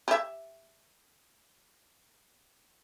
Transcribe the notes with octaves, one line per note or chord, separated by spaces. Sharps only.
G4 E5